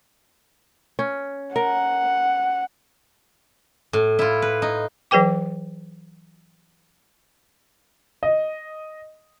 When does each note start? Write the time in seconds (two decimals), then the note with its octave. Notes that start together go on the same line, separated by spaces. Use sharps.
0.99 C#4
1.56 A#4 F#5
3.93 A2
4.19 E4 F4
4.42 B4
4.62 D#4
5.11 E3 F#3 G#4 B4 G5 D6
8.23 D#5